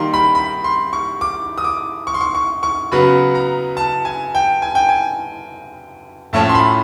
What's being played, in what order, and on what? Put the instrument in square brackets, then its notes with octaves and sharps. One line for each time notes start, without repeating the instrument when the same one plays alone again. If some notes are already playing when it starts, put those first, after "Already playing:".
Already playing: [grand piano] D#3 G3 A#3 D#4 C6
B5
B5
C6
C#6
D6
D#6
D6
C#6
C6
C#6
C#6
C#6
C#3 F#3 B3 B5
A#5
A5
G#5
G5
G#5
G5
G#5
A2 F3 A3 C#4 A5
C6
B5